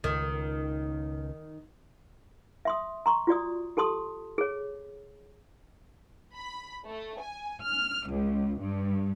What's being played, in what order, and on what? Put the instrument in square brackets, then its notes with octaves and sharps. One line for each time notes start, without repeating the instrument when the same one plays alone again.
[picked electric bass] C#2 [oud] D#3
[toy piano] E5 C6 D#6
A#5 C6 C#6
F4 F#4 D5 D#6
G4 A4 A5 C6 D#6
G#4 C#5
[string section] B5
A3
G#5
F6
C#2
G2